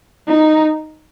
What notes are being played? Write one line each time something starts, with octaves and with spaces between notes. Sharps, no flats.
D#4